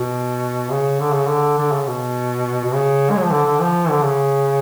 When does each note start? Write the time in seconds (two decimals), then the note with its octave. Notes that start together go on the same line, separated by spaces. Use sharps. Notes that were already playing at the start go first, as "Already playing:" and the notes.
Already playing: B2
0.71 C#3
1.00 D3
1.14 C#3
1.29 D3
1.58 D3
1.72 C#3
1.87 B2
2.64 B2
2.74 C#3
3.10 G#3
3.16 F#3
3.23 F3
3.31 D3
3.45 D3
3.60 F3
3.89 D3
4.04 C#3